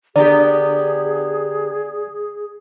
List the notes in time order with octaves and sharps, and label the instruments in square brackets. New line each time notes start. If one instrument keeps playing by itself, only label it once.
[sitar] D3 B3 G4 [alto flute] G#4 [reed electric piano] D5